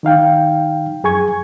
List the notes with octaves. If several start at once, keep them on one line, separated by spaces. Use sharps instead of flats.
D#3 D#4 F5 G5
F#2 G#4 G#5 C#6 G#6